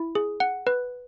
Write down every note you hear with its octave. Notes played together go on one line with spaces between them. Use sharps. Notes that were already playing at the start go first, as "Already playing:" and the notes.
Already playing: E4
G#4
F#5
B4